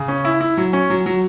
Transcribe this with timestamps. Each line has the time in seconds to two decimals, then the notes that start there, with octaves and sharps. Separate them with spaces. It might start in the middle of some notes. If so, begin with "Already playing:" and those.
Already playing: C#3
0.08 C#4
0.25 E4
0.40 E4
0.57 F#3
0.73 C#4
0.90 F#3
1.06 F#3